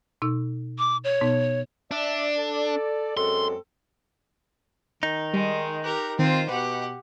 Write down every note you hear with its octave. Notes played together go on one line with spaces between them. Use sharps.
B2 D#4 E6
D6
C#5
B2 B3 D#4
D4 D5 E5
A4
F#2 G#3 C4 A4 C6
D#3 D#4
G3 G#3
G4 A#4 F#6
D#3 C4 F4 C5
B2 G4 B4 F#5